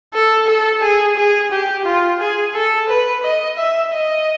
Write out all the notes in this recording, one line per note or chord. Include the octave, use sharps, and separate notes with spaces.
A4
A4
G#4
G#4
G4
F4
G#4
A4
B4
D#5
E5
D#5